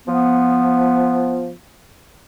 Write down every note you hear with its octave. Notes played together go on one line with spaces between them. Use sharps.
F3 B3